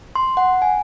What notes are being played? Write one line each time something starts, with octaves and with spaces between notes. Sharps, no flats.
C6
F#5
G#5